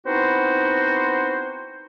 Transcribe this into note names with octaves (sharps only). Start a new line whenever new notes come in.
B3 C4 D#4 E4 F#4 C5